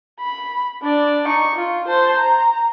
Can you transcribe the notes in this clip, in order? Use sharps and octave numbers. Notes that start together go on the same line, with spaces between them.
B5
D4 D5
D#4 C#6
F4
C5 A5
A#5